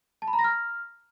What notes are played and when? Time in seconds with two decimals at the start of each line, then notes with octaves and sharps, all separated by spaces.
0.22 A5
0.28 B5
0.33 A#5
0.39 A#6
0.44 F6